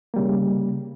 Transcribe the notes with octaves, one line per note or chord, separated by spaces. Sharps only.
C#3 G3 A#3